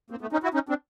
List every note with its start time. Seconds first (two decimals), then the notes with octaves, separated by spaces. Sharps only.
0.10 A#3 C4
0.21 A3 B3
0.33 C#4 D#4
0.43 E4 F#4
0.54 C#4 D#4
0.69 C4 D4